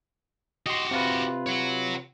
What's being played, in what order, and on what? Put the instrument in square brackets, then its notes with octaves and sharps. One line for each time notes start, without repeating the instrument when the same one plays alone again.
[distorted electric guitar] F#4 G4 [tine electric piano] D#5 C6
[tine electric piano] C3 F4 B4
[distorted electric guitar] C#5 F#5